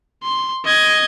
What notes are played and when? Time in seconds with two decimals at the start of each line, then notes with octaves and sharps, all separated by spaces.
0.23 C6
0.65 D#5 G#6